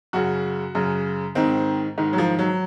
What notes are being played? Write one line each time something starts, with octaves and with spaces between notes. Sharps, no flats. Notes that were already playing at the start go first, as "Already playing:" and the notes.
F#2 C#3 F#4
F#2 C#3
G#2 D#3 C4
G#2 D#3
F#3
F3
F#3